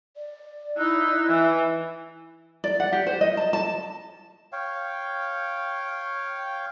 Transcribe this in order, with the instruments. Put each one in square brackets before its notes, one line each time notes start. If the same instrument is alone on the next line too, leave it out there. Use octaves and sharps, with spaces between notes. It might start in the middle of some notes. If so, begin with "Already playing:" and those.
[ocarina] D5
[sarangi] D#4 [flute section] E4 E6 F#6
[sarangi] E3 [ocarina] E5
[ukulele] D5
F#5
G4
C5
D#5
A5
A5
[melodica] C#5 F5 G5